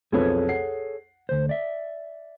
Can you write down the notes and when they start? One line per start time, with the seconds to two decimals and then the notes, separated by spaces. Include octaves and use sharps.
0.13 B1 F2 G#4 A4 B4 C#5
0.48 F#5 C7
1.29 D2 C5
1.49 D5 E5